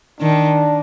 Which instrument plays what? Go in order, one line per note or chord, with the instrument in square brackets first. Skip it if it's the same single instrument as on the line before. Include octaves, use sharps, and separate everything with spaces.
[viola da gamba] D#3 [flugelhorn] D4